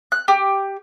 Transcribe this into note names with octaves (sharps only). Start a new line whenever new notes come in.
F#6
G4